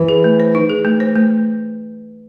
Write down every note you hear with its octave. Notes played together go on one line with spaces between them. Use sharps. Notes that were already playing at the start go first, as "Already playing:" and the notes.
Already playing: E3
G#4
A3
C5
D#4
G#4
A3
C5
A3